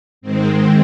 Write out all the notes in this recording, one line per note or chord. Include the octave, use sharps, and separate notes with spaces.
G#2 D#3 G#3 C4